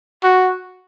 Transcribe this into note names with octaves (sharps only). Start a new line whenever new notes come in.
F#4